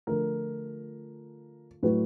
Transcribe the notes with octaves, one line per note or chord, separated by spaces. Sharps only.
D3 F3 A3 A#4
A2 F#3 A3 B4